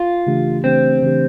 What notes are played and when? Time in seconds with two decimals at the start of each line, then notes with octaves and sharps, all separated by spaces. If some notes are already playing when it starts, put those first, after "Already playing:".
Already playing: F4
0.27 C#3 E3 A3 D4 G4
0.64 C#3 E3 A3 C4 D4 G4
1.02 C#3 E3 A3 D4 G4